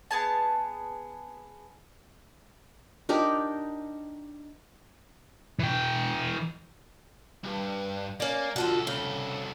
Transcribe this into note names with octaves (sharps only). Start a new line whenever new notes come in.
B3 G#4 A5
D4 D#4 G4 A#4
E3 G5
C2 G2
A#3 C#4 D5
C2 D3 F3 F#4 A4
C#3